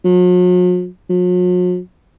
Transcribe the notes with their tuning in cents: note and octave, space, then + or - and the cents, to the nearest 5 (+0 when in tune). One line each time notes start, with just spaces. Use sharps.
F#3 -45
F#3 -45